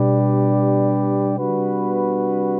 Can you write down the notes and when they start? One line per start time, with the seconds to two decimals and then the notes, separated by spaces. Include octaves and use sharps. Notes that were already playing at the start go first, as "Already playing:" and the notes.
Already playing: B2 G3 D4 G4 B4 D5
1.38 C3 G3 D4 F#4 B4
1.48 D3
1.58 C3
1.83 B2
2.28 C3